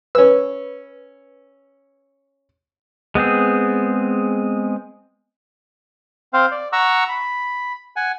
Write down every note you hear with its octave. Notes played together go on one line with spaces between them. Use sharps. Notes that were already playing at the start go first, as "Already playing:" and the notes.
C#4 B4 E6
G#3 B3 C4 G#4
C4 C5 F5
D5
F#5 A#5 C#6 E6
B5
F#5 G#5